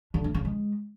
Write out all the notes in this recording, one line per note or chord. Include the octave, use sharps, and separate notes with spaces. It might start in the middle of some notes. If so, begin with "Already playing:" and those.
D3
A3
C#3
G#3